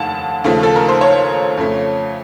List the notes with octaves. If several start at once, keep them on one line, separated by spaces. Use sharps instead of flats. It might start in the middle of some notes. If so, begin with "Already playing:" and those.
Already playing: F1 D#2 C#3 F#5 A5
D#2 C#3 F3 A3
A4
A#4
C5
C#5
F2 C#3 A3